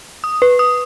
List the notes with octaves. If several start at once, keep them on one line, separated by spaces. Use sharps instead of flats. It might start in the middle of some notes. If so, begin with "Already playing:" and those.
D#6
B4
D#6